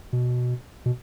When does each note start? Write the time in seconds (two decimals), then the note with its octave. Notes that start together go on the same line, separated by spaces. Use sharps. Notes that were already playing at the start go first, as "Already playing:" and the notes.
0.13 B2
0.86 B2